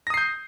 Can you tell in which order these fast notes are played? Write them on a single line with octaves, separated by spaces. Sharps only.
A#6 D#6 C7 G6